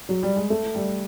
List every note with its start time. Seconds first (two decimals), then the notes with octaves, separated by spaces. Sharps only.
0.09 F#3
0.23 G3
0.36 G#3
0.50 A3
0.75 G3